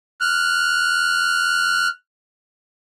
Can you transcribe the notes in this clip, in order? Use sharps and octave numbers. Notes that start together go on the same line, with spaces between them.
F6 F#6